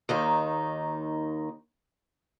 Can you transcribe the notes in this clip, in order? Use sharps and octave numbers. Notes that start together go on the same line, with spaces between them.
D#2 D#3 D#4